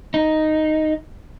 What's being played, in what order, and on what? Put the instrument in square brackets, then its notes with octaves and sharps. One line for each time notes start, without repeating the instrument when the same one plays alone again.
[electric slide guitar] D#4